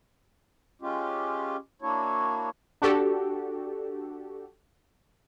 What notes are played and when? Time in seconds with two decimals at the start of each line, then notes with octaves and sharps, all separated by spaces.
0.82 G#3 C#4 F4 G4
1.82 A#3 D4 E4 F#4 C#5
2.82 D4 F#4 G4 A4